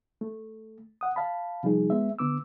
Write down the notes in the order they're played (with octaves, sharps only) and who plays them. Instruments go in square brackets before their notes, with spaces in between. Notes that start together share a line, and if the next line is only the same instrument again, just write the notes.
[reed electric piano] A3
F#5 D#6
F5 A5 B5
C3 F3 G3 D#4 G#4
G#3 B3 E5
D3 B3 D6 E6